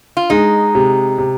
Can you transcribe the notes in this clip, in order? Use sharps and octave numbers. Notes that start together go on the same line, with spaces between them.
F4
G#3 D#4
C3
C3